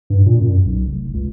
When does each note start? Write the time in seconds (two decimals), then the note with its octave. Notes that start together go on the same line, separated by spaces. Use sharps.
0.10 G2
0.26 A#2
0.41 F#2
0.65 B1
0.87 F1
1.14 C#2